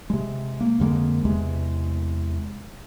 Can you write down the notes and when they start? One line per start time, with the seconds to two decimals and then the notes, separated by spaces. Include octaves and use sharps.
0.10 C3 G#3
0.61 A#3
0.80 F2 D3 G#3 A#3
1.25 E2 C3 G#3